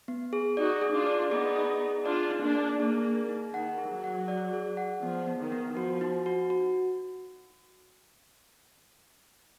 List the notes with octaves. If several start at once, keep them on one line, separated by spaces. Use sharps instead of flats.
B3
G#4
D#4 F#4 D5
G#4
D4 F4
D5
B3 D#4 G#4
G#4
G#4
D4 F4 D5
D#4
A#3 D4
D5
A#3 G#4
G#4
D#4
D#3 F#5
G#4
F#3
F#5
D5
G#4
F#5
F3 B3
B3
D#3
B3
F3 F#4
D#4
F#4
F#4